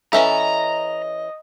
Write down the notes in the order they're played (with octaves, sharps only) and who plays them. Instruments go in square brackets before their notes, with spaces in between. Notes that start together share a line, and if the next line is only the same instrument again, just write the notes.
[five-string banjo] E3 C#4 A4 [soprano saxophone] D#5 [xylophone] E5 [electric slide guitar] A#5